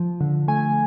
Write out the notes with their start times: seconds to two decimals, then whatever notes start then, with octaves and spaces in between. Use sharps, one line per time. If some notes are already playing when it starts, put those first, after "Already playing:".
Already playing: F3
0.21 D3
0.48 A3 G#5